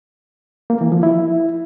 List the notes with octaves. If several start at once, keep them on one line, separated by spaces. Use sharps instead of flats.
A#3
E3
F3
E4